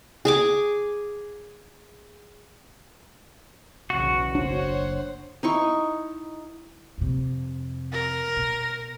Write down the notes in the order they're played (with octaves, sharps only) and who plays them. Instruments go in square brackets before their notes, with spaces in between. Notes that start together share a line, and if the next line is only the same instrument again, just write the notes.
[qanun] G#4 G#5 D6
[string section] B1 E2 C#3 [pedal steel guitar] F#4
[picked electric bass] F#1 D4 [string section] C5 C#5 F#5
[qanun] D#4 E4 C#6
[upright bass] F2 C3
[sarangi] A#4
[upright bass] B2